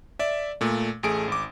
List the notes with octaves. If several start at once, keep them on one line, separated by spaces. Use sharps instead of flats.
D5 E5
A#2 A3
A1 A3 G#4 D7
G#1 D6